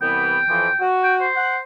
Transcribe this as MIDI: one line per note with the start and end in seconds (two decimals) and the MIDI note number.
0.02 0.39 36
0.02 0.39 52
0.02 0.39 59
0.02 0.83 79
0.49 0.69 41
0.49 0.69 52
0.49 0.69 53
0.80 1.27 66
1.04 1.14 79
1.20 1.61 72
1.36 1.55 78